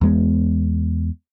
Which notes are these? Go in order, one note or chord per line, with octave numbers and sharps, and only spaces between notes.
E2 G#3 B3